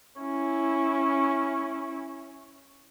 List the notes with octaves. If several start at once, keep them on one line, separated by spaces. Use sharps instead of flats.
C#4 E4